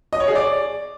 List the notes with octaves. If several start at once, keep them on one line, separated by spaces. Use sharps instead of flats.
D#5
C#5
G#4
D5